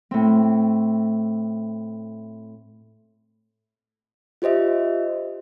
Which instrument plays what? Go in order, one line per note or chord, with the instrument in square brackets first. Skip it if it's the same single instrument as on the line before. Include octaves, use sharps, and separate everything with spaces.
[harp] A2 C4
[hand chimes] F4 G4 C5 D#5 E5